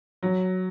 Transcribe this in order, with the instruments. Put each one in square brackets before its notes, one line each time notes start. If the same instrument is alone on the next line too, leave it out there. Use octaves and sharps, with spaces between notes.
[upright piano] F#3